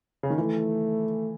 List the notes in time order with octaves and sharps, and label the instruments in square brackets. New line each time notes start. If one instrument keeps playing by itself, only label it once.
[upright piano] C#3
D#3
[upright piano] E3 [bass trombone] A3